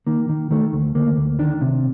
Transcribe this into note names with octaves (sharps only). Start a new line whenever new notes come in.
D#3 A#3
D#3
D#3 A3
D2
D2 A#3
D2
D#3 D4
C3